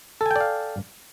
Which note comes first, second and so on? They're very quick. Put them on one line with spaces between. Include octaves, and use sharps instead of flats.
A4 G#5 G5 D5 F5